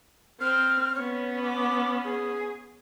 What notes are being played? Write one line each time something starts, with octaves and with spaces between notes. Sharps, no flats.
C4 F6
B3 C#4 C#5
D6
G#4